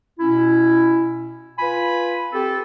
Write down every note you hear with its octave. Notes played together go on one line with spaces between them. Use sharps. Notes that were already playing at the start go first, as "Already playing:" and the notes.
B2 C#4 E4
F4 B4 G#5 B5
C4 G4 A4